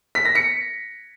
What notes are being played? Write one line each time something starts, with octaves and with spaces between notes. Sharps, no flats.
B6
A#6
C#7